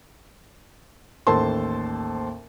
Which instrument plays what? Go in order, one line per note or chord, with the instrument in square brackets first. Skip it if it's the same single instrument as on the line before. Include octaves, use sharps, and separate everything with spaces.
[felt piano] A1 D#2 A4 C5 A5 C6